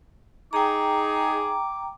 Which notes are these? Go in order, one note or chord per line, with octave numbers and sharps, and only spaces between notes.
D#4 G#4 G5 A#5 D6